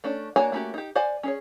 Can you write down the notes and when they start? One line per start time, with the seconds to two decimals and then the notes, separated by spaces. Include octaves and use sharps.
0.04 A3 C#4 D4
0.36 A#3 D4 F#4 C#5 G#5
0.52 A3 A#3 C#4 F#4 G4
0.74 D#4 G4
0.95 C5 D5 F#5 G#5
1.23 C#4 G#4 C#5